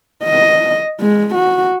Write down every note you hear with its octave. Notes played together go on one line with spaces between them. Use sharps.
D#5
G#3
F#4